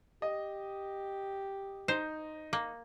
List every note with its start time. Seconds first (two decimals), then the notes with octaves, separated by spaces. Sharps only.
0.22 G4 D#5
1.88 D#4 C5
2.53 A#3